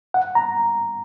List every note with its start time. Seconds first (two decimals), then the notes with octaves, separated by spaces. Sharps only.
0.14 F#5
0.35 A#5